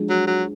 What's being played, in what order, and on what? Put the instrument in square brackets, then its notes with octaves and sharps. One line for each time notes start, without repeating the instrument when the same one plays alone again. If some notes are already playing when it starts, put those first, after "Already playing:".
Already playing: [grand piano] F3 G#3 D4 F#4
[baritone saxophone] F#3
F#3